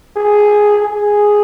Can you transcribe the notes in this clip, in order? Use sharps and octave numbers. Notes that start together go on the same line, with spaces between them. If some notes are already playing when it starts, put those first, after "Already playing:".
G#4
G#4